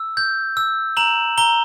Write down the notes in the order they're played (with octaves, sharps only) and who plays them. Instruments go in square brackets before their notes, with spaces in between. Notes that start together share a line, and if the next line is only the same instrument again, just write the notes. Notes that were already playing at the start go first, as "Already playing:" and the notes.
Already playing: [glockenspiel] E6
G6
E6
A#5 E7 F#7
A#5 G7